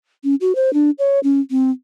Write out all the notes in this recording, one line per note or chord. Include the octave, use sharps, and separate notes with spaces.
C#4
F#4
C5
D4
C#5
C#4
C4